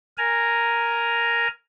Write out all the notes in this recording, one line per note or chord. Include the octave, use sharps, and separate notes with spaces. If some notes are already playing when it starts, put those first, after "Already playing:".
A#4 G#5 A#5